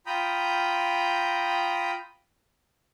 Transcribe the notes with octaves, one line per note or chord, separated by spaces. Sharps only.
F4 G5 A#5 B5 D#6 G6